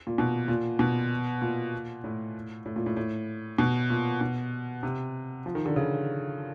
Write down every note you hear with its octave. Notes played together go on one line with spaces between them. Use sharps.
A#2
B2
A#2
B2
A#2
A2
A2
A#2
A2
A2
B2
A#2
B2
C3
F3
D#3
D3
C#3